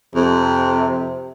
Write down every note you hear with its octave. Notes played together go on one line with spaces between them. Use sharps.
F2 C3